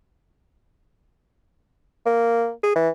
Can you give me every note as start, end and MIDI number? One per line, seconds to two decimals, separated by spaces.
2.06 2.50 58
2.63 2.72 68
2.75 2.89 52